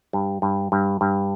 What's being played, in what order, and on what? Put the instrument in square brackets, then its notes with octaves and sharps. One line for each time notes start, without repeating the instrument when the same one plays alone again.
[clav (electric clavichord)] G2
G2
G2
G2